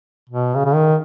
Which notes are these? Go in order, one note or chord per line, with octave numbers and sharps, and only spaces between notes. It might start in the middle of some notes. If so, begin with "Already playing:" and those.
B2
C#3
C#3
D#3